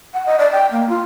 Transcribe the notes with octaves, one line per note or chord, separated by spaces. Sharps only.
F#5
D#5
D5
G5
A#3
F4